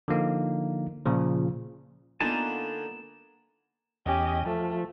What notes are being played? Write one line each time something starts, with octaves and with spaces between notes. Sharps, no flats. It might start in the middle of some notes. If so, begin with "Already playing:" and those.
D3 F3 A#3 D#4
A#2 C#3 F3
D3 A#3 B3 D#4 F4 G#5 A5 E7
E2 C#4 G4 D#5
F3 A3